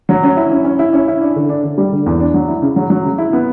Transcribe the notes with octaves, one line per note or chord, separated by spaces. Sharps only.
F#3
C#4
E4
C#4
C#4
E4
C#4
E4
D4
D3
D4
D3
G3
D3
E2
D4
F#3
E4
C#3
F#3
F#3
C#3
E4
B3